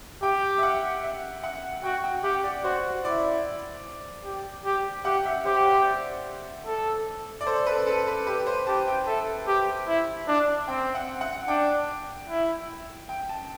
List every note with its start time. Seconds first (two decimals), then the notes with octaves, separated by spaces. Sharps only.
0.23 G4 G5
0.58 E5
0.63 F#5
1.03 E5
1.44 F#5
1.83 F#4 G5
2.04 G5
2.24 G4 F#5
2.44 D5
2.64 F#4 C5
3.04 E4 D5
4.25 G4
4.65 G4
5.05 G4 F#5
5.25 E5
5.45 G4 C5
5.66 C5
5.86 D5
6.66 A4
7.41 D5
7.46 A4 C5
7.66 B4
7.87 A4
8.07 B4
8.27 G4 B4
8.47 C5
8.67 G4 A5
8.87 G5
9.07 A4 E5
9.47 G4
9.88 E4
10.28 D4
10.68 C4 G5
10.95 F#5
11.21 F#5
11.48 D4 G5
12.29 E4
13.09 G5
13.29 A5